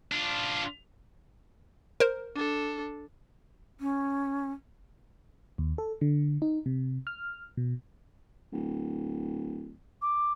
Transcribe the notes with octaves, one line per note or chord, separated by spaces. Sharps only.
D4 F4
A#4 C5
D4 A4
C#4
D#2
A4
D3
D#4
C3
F6
B2
D1
D6